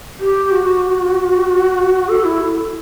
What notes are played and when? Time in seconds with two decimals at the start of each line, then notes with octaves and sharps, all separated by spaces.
0.20 G4
0.51 F#4
2.09 A4
2.24 E4